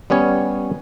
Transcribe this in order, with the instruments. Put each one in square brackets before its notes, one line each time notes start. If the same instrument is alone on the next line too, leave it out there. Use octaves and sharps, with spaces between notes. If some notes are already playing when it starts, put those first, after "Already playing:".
[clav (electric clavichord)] G3 B3 C#4 C#5